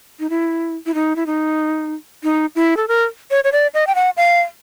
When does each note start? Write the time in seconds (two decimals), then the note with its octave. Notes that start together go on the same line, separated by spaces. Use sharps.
0.20 D#4
0.30 E4
0.86 E4
0.94 D#4
1.16 E4
1.26 D#4
2.24 D#4
2.56 E4
2.77 A4
2.88 A#4
3.31 C#5
3.44 C#5
3.52 D5
3.74 D#5
3.87 G5
3.95 F#5
4.17 F5